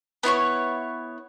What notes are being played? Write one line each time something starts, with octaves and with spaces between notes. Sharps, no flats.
B3 E4 C5 C#5